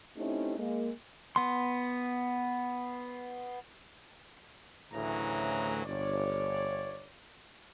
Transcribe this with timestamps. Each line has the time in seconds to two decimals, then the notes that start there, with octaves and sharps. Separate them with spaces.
0.17 A3 C4 C#4 D#4 E4 G4
0.59 G#3 A#3
1.36 B3 C6
4.92 D2 A2 C#3 E3 F#3 A#5
5.85 G1 C#5 D5